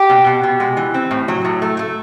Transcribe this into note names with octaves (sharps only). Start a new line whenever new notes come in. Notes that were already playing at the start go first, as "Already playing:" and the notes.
Already playing: G4
B2
B2
B2
G#3
E3
C4
A2
F#3
A2
A3
A3